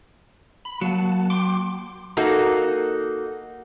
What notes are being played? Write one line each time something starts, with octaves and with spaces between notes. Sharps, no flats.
B5
F#3 A#3 F#5 A5
G5 C6 D6
A#3 D#4 F#4 A4